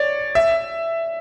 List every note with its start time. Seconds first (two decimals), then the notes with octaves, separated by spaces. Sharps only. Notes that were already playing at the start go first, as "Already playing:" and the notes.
Already playing: C#5 D5
0.35 E5